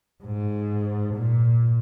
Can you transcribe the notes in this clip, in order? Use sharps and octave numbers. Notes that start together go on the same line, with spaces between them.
G#2
A#2